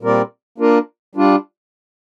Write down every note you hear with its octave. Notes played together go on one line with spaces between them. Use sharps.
A#2 G3 C4 A#4 D5
A#3 D4 F4 A#4
G3 D4 F4